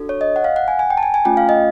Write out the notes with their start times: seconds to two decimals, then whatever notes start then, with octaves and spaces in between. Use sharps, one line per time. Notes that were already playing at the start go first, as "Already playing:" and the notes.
Already playing: D4 F#4 A4
0.09 C#5
0.21 D#5
0.36 F#5
0.44 F5
0.56 F#5
0.68 G#5
0.79 G#5
0.90 G5
0.97 A5
1.03 G#5
1.14 G#5
1.25 A3 C#4 F4 G5
1.37 F5
1.49 D#5